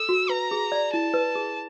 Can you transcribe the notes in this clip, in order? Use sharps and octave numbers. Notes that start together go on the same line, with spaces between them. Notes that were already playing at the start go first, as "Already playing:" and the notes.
Already playing: A4 E6
F#4
B4 A#5
G#4
D5
E4 A5
B4
G#4